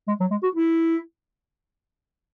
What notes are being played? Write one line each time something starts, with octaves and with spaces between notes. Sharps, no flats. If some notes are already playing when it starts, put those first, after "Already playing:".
G#3
F#3
G#3
F#4
E4